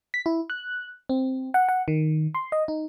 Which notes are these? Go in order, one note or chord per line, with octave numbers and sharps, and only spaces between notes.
B6
E4
F#6
C4
F#5
F#5
D#3
C6
D#5
D#4